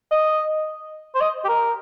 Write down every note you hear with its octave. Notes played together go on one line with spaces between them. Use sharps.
D#5
C5
D#5
G4
A#4